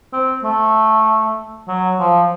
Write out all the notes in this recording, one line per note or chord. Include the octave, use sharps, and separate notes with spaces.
C4
A3
F#3
F3